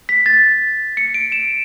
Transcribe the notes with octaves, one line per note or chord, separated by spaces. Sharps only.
B6
A6
C#7
D7
E7